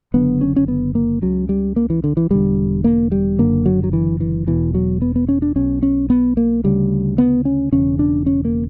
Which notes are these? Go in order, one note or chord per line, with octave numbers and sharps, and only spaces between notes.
F#1 F#2 D3 B3
C#4
C#4
B3
A#3
C#2 C#3 F#3
G3
A#3
E3
D3
E3
E1 E2 D3 G3
A#3
G3
F#1 F#2 D3 A#3
F#3
F#3
E3
E3
E1 E2 B2 E3
F#3
B3
B3
C#4
D4
B1 B2 C#4
C#4
B3
A#3
D2 C#3 G3
B3
C#4
E1 E2 C#3 C#4
D4
C#4
A#3